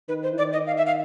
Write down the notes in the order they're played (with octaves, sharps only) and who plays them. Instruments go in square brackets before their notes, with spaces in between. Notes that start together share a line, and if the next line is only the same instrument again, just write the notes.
[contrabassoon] D#3 [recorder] B4
[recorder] C5
[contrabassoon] E3
[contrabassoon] D#3 [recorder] D5
[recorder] D#5
F5
E5
F5